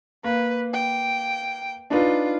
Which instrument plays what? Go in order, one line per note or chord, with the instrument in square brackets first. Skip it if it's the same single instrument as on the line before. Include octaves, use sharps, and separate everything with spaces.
[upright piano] A#3 [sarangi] B4
[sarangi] G5
[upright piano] D4 D#4 B4 [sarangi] F4